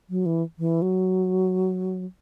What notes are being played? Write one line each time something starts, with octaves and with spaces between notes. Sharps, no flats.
F#3
E3
E3
F#3